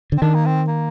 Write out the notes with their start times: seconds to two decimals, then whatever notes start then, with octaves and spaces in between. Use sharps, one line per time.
0.12 D3
0.18 C4
0.22 D#3 D4
0.35 A#3
0.46 C4
0.68 A#3